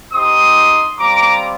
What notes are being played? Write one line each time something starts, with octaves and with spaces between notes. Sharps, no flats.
C4 D#4 G4 C6 D#6
G3 C4 F4 A#5 D6